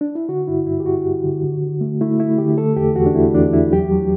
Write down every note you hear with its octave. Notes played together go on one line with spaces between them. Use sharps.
D4
E4
D3 F#4
G2 E4
G2 E4
G4
G2 F#4
G2
D3
D3
D3
A3
A3 E4
A3 E4
D3 G4
A3 A4
E2 G4
E2 F#4
D4
A3 E4
E2 D4
E2 E4
F#3 G4
F#3